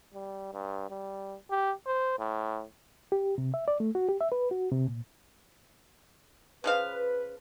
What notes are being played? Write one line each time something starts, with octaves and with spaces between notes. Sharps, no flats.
G3
G2
G3
G4
C5
A2
G4
C3
E5
D5
A3
F#4
G4
E5
B4
F#4
C3
A#2
C#3 F3 B4 F5